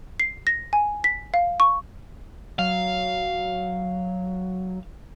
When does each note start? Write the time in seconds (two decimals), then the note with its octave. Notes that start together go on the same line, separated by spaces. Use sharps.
0.20 C7
0.47 A#6
0.73 G#5
1.04 B6
1.34 F5
1.60 C#6
2.59 F#3 F5